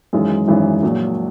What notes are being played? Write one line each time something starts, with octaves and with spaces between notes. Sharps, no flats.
G#1 F#2 E3 G#3
G#1 F#2 E3 G#3
A#1 A#2 F#3 A#3